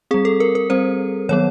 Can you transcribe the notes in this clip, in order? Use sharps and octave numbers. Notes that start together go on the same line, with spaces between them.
G3 C4 G#4
A4
A#4
A#4
G3 C4 C5
D#3 F#3 B3 C#5